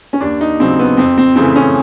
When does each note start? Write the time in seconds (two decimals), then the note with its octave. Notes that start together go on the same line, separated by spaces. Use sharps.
0.13 C#4
0.21 D#2 D4
0.41 D#4
0.59 C#3 F#3 C4
0.79 B3
0.97 F2 C4
1.18 C4
1.36 C#3 E3 A3 C4
1.56 C#4